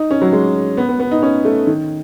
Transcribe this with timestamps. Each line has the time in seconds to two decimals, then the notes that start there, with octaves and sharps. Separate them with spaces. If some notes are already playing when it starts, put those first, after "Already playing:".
Already playing: D#4
0.11 C#4
0.22 F#3
0.33 G#3
0.77 B3
0.89 B3
1.00 B3
1.11 D#4
1.23 C#4
1.45 A3
1.67 D#3